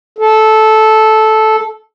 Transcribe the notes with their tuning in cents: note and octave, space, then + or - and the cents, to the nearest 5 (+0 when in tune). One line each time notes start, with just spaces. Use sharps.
A4 -10